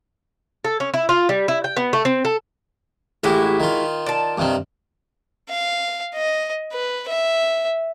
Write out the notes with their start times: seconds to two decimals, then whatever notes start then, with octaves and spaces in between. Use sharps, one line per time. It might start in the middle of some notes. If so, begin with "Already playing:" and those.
0.65 A4
0.80 C#4
0.94 E4
1.09 F4
1.29 G3
1.48 E4
1.64 G5
1.77 B3
1.93 A3
2.05 C4
2.25 A4
3.24 A1 G#3 E4 F#4 G4
3.60 D#3 F4
4.06 D5 A5
4.38 G2 C3 D#3
5.49 F5
6.14 D#5
6.72 B4
7.08 E5